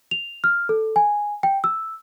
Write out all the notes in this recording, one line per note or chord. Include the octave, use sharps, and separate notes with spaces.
F7
F6
A4
G#5
G5
E6